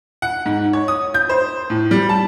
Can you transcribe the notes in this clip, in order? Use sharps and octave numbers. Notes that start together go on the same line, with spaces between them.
F#5
G#2
C#5
D#6
G6
C5
A2
G3
A5